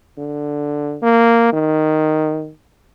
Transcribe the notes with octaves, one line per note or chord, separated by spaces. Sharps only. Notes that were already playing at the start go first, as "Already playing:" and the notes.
D3
A#3
D#3